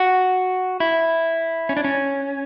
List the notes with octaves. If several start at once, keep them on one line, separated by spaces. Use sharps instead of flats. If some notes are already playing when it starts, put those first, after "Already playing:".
Already playing: F#4
E4
C#4
D4
C#4